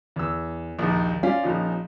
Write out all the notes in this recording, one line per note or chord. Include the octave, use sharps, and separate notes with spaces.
E2 E6
A#1 D#2 D#3
C#4 F4 D5 F5
A#1 F3 D#4